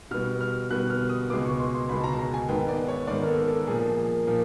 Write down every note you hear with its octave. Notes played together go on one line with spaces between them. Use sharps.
B2 G3 B3 F6
F6
B2 G3 B3 F#6
F6
D#6
C#2 B2 G#3 B3 D6
C#6
C6
C6
C#2 B2 G#3 B3 B5
A5
A#5
A5
A#5
G#5
G#2 D#3 G#3 B3 G5
D5
C#5
G#2 D#3 G#3 B3 D5
A#4
A4
A4
A#2 F3 A#3 G#4
A#2 F3 A#3